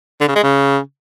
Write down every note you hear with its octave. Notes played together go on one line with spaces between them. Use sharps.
D3
C#3
G#3
C#3